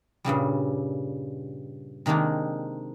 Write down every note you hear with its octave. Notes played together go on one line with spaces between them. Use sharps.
G2 A#2 C#3 G3
C3 D#3 G#3 A#3 D4